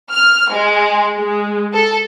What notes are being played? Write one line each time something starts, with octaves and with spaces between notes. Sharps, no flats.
F6
G#3
G#3
A4